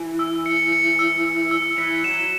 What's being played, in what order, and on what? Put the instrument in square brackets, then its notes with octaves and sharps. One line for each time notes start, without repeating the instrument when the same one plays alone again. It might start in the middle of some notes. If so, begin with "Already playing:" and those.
Already playing: [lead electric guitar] E3
[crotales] E6
C#7
C#7
E6
E6
E6
[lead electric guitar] E3 [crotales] B6
[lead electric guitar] F#3 [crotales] E7